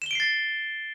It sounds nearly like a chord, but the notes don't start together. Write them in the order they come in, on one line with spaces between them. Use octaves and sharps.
E7 G7 D7 C7 A6